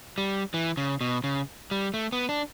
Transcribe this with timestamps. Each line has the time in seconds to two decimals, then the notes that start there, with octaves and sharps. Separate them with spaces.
0.18 G3
0.54 E3
0.77 C#3
1.01 B2
1.24 C#3
1.71 G3
1.94 A3
2.12 B3
2.29 D4